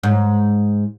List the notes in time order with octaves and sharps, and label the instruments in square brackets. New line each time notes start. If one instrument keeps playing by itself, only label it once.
[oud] G#2